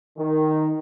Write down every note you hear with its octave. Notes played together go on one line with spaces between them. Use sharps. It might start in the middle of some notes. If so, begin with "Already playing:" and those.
D#3